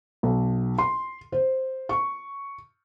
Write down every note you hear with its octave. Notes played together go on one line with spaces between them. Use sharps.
B1
C6
C5
C#6